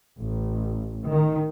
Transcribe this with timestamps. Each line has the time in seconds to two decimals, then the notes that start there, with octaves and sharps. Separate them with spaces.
0.19 A1
1.09 D#3